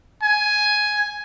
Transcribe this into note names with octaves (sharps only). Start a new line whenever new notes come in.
G#5